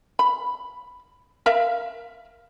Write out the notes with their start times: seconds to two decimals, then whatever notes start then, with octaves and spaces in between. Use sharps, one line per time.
0.19 B5
1.46 A#4 E5 F5